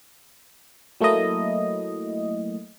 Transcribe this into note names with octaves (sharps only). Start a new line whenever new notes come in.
F#3 A3 A#3 E4 D#5